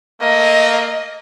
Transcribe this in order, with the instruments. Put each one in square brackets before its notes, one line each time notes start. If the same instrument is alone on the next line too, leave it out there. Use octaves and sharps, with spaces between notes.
[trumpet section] A3 A#3 [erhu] D#5